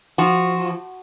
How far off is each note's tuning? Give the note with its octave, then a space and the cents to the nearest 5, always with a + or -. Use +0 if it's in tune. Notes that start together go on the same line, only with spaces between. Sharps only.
F3 +0 F#4 +0